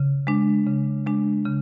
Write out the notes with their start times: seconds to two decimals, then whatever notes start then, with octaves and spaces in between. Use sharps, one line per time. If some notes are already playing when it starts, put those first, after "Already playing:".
Already playing: C#3
0.27 G#3 D4
0.67 C#3
1.06 G#3 D4
1.45 C#3